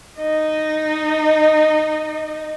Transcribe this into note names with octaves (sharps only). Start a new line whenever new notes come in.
D#4 D#5